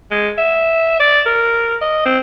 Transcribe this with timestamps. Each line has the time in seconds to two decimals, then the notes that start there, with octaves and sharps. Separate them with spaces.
0.11 G#3
0.38 E5
1.00 D5
1.26 A#4
1.81 D#5
2.05 C4